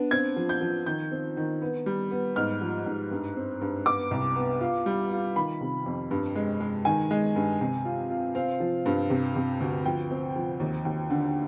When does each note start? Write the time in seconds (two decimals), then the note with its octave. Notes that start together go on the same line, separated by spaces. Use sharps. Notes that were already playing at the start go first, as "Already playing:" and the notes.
Already playing: B3 D4
0.11 C4 G#6
0.36 F3
0.49 G6
0.61 F3
0.86 D#3 G6
1.11 C4
1.37 D#3
1.62 B3
1.86 G3
2.11 B3
2.36 G#2 F6
2.61 F3
2.86 G#2
3.11 G2
3.36 C4
3.61 G2
3.86 B3 D6
4.11 C2
4.36 B3
4.61 F4
4.86 G3
5.11 F4
5.36 D#3 B5
5.61 C3
5.86 F2
6.11 G2
6.35 G#3
6.60 G#3
6.85 D#3 G#5
7.11 G#3
7.36 G2
7.61 C3
7.85 F4
8.10 F4
8.35 C4 F5
8.60 F3
8.86 G2
9.10 C3
9.36 C3
9.60 D2
9.85 F3 G5
10.11 C4
10.36 F3
10.60 D#2
10.85 D#2
11.10 D3